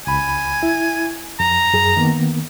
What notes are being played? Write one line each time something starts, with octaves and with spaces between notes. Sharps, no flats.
C#2 G#5 B5
E4
F2 A#5
F#2 G#4
D#3 A#3 B3